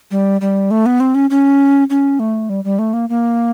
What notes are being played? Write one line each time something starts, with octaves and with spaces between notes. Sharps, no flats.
G3
G3
A3
B3
C4
C#4
C#4
C#4
A3
G3
G3
A3
A#3
A#3